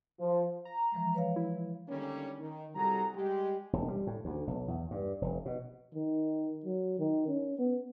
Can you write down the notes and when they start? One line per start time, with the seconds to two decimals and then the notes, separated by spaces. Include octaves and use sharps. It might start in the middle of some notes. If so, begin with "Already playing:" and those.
0.20 F3
0.65 A#5
0.92 E3 F3 G#3
1.14 B4 C#5 F5
1.36 E4
1.88 D3 D#3 G3 G#3 A#3 C#4
2.39 D#3
2.75 C2 G3 F#4 G#4 A4 A#5
3.14 G3 G#3 G4
3.73 E1
3.88 G3
4.07 A2
4.25 D2
4.47 B1
4.68 E2
4.91 G2
5.22 F1
5.46 B2
5.94 D#3
6.65 F#3
6.99 D#3
7.28 C#4
7.59 B3